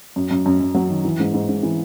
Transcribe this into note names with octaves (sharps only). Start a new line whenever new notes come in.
F#2
F#2
F#2
F#2
F#3
D#3
E3
G#2
G#2
G#2
E3